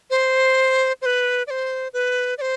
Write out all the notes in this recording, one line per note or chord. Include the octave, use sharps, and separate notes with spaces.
C5
C5
B4
D5
C5
B4
D5
C5